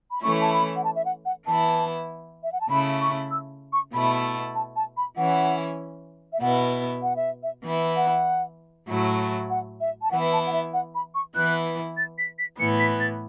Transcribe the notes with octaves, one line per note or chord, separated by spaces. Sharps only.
B5
E3 A3 C#4 E4 C#6
A5
B5
F#5
A5
E5
F#5
F#5
E3 B3 E4 A5
E5
F#5
A5
C#3 A3 E4 B5
C#6
E6
C#6
B2 A3 E4 B5
A5
A5
B5
E3 C#4 E4 F#5
E5
B2 B3 E4 F#5
F#5
E5
E5
E3 B3 E4
F#5
A2 F#3 A3 E4
F#5
E5
A5
E3 B3 E4 F#5
A5
F#5
E5
F#5
B5
C#6
E3 B3 E4 F#6
A6
B6
B6
A2 E3 B3 C#7
B6
A6